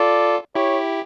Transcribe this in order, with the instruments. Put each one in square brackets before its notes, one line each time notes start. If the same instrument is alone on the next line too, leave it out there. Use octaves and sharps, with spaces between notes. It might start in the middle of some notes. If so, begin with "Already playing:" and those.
Already playing: [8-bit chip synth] F4 A4 [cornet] D5
[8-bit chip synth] E4 G4 [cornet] C#5